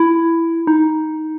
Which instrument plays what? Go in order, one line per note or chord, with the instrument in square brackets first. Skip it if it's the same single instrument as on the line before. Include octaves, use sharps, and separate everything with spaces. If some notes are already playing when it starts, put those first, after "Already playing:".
Already playing: [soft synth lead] E4
D#4